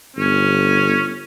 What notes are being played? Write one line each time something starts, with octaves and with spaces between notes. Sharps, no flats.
G1 C#4